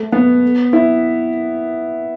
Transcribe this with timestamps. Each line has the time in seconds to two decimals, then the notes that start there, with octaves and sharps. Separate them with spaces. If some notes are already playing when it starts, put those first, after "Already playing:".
Already playing: A3
0.12 B3
0.73 E4